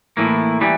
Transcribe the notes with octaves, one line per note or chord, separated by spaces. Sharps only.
A2 E3 A#3
E3 G3